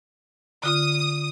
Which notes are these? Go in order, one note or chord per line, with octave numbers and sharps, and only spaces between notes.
D3 F4 D#6